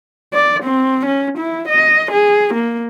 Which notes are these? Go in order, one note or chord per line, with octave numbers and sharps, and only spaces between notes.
D5
C4
C#4
E4
D#5
G#4
A#3